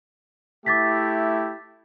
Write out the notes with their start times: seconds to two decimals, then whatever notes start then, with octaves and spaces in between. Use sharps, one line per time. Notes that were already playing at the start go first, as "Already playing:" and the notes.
0.66 A3 E4 G4 D6 A6 B6